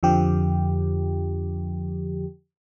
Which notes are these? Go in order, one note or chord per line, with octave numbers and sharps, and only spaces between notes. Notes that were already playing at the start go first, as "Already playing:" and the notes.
F2 D3 F3 G4